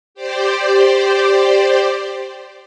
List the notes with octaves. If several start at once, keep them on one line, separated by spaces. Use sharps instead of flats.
G4 C5 D5